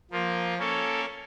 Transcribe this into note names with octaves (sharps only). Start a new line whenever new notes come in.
F3 A#3 F4
A#3 C#4 A4 C#5